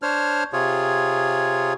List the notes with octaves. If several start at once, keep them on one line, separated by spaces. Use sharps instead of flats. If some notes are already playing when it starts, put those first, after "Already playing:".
D4 C5 C#5 F6
C3 F4 G#4 C#5